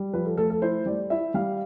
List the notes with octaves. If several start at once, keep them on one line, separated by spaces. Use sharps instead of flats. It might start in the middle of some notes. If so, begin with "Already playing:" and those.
Already playing: G3
F3 B4
A4
A3 A4
A4
E4 C5
G3 D5
E4 E5
G3 F5